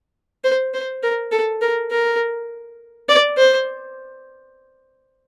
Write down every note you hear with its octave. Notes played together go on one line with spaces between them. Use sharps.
C5
C5
A#4
A4
A#4
A#4
D5
C5